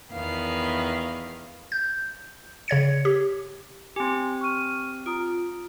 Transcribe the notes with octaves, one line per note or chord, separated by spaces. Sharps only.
E2 D#3 B3 F5
G6
C#3 C#5 G#6 C#7
G4
C4 G4 G#5 C6
C#6 F6 D#7
F4 A#5 D#6 D7